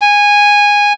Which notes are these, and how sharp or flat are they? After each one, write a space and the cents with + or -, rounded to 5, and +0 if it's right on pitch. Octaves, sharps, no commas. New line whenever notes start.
G#5 -10